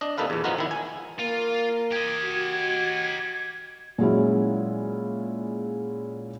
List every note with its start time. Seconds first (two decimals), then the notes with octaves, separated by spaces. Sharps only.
0.01 D4 D#5
0.18 C3 A#3 D#4 A4 B4 F5
0.30 E2 A#2
0.44 F3 B3 D#4 F4 F#4 A#4
0.58 D#3 E4
0.71 G#5
1.19 A#3 F4
1.92 G4 D#5 G#6
2.24 F#4
3.98 A#2 F#3 G#3 C#4 E4